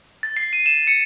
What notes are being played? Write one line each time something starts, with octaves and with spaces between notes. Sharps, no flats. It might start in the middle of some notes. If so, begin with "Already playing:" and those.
A6
C7
D#7
E7
C#7